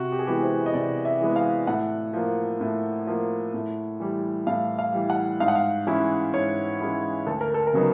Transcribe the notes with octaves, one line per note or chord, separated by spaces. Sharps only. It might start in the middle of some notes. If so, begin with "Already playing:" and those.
Already playing: C3 F#4
G4
G#4
E3 G#3 B3 G4
C5
D#5
C3 D5
E5
E3 G#3 B3
F5
A2 F#5
F3 A#3
A2
F3 A#3
A2
E3 G3
A2 F5
F5
E3 G3
F#5
G#2 F5
F#5
F5
E3 G#3 C#4 E4
G#2 C#5
E3 G#3 C#4 E4
D2 A4
A#4
A4
A#4
C#3 F#3 B3 D#4